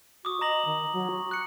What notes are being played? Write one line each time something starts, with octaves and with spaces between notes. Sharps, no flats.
F#4 D6 D#6
D#5 A#5 A#6 F#7
D#3
F#3
F#4
F#6 C#7